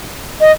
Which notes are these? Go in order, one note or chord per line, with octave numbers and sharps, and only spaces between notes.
D#5